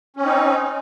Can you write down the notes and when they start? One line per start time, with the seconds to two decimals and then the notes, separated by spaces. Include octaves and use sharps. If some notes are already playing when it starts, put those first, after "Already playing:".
0.16 C#4
0.21 C4
0.26 D#4